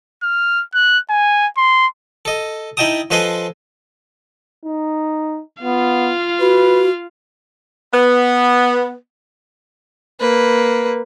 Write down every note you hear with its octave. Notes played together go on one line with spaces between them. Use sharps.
F6
F#6
G#5
C6
A4 D#5
D#4 E4 D#5 G5 A5 D#6
F3 A4 B4 D#5 G#5 C6
D#4
B3 F4 F5
F#4 B4
B3
A#3 B4